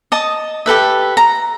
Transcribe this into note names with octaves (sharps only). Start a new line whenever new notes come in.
D#5 A5 D#6
G4 A4 B4 E5
A#5